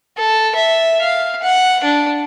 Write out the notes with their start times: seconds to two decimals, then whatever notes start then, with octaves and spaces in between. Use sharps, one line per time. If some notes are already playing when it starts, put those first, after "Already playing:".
0.18 A4
0.55 E5
1.01 F5
1.43 F#5
1.84 D4